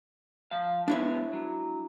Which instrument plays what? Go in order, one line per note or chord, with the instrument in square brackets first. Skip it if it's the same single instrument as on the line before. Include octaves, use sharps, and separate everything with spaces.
[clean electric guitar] F3 F5
[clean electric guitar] G#3 B3 C#5 [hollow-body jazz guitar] D4 E4 E5
[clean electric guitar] F#3